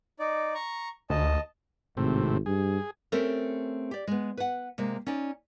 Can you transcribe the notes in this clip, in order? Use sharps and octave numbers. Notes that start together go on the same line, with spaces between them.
D#4 D5
A#5 C#6
D2 D#5 A5
G#1 A2 C3
G2 G#4
A3 C4 C#4 G4 A4 A#4
G4 D5
G#3 B3
B4 F#5
C3 G#3 A#3
C#4 D#4 D5